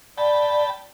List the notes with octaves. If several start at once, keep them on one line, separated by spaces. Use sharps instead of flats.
D5 G5 A5 B5